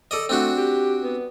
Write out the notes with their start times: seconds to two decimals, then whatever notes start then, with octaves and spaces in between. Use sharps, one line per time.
0.11 A4 D5 D#5
0.29 A3 C4 D4 F#4
0.57 G4
1.03 B3